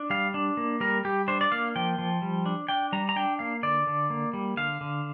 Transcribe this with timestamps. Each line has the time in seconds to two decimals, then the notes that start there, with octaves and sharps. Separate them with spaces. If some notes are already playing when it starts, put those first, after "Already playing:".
Already playing: D4
0.10 G3 F5
0.34 D4
0.57 A#3
0.80 G3 A#4
1.05 G3 G4
1.28 D4 C5
1.41 D5
1.52 A#3 F5
1.76 F3 G5
1.98 F3
2.22 G3
2.46 D4
2.68 D4 G5
2.92 G3 A#5
3.09 A#5
3.16 D4 G5
3.39 A#3 F5
3.63 D3 D5
3.87 D3
4.10 A#3
4.33 G3
4.57 D3 F5
4.81 D3